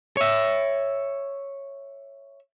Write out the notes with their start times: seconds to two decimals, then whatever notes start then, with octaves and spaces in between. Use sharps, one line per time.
0.17 C#5 E5